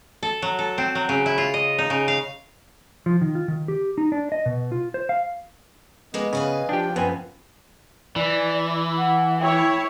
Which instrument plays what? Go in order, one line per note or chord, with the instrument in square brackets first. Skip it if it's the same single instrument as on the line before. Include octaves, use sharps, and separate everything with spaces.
[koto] A4
F#3
A4
C4
F#3
C#3
E4
F4
D#5
D#4
C#3
F5
[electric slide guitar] F3
D#3
F4
D#3
G4
D#4
D4
D#5
B2
F4
C5
F5
[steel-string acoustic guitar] D#2 G#3 A#3 [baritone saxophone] B3 [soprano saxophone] D#5
[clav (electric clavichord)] C#3 [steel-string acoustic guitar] B4 F5 G#5
[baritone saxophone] F3 [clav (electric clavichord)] D4 G4 [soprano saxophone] G5
[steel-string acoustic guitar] F#2 [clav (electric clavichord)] B3 C4 G#5 [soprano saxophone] B4
[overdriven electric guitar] E3 [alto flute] D5
[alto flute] F#5
[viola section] E4 C#5 [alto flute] G5